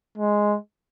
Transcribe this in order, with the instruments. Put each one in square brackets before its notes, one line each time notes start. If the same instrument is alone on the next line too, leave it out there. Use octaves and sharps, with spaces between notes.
[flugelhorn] G#3